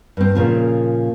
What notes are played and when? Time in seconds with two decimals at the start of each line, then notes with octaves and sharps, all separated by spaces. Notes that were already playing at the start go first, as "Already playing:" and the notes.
0.17 G2 C4
0.35 A#2 C#3 F3